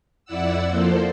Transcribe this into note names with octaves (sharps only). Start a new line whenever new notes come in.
F2 E4 D5 F#5 E6
F3 A#3 A4 C5